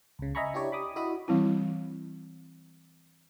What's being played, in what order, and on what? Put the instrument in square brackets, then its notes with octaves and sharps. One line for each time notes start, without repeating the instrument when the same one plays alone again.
[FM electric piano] C#2 C#3
D#5 E5 G#5 A#5 B5 C#6
D4 E4 G4 C#5 D5
B5 D6 D#6
E4 F#4 D#5 B5 D#6
[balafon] E3 G3 C4 E4